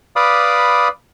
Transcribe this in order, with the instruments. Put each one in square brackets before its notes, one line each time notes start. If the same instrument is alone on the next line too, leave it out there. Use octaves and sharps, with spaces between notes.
[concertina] B4 D5 F5 B5 D6 D#6